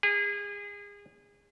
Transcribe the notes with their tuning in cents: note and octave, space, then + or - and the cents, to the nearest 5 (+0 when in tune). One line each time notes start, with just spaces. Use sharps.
G#4 -30